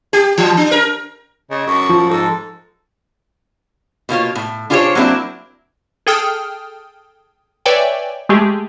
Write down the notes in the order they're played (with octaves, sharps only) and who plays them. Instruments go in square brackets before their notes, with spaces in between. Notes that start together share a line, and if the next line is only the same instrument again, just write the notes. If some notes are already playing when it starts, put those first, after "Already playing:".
[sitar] G4
E3
D4
A#4
[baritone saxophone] C#3 [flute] D#5
[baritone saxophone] F#2 [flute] C#6
[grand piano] F3
[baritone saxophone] G#2 [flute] A4
[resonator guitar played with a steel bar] B2 A#3 F4 C#5
A2
D4 F4 G4 G#4 C5 C#5
F#3 A#3 C4 D4 E4
[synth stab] G#4 A4 G5 D#6 F6
B4 C#5 D5 E5 G5 G#5
G#3 A3 G4 G#4